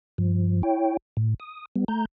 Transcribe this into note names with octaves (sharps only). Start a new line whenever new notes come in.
G2 F3
E4 C#5 G5
A2
D#6
G3 B3
A3 A#5 G6